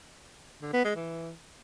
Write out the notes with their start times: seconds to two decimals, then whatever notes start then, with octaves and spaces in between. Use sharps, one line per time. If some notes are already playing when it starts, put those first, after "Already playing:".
0.62 D3
0.73 B3
0.84 G#3
0.96 E3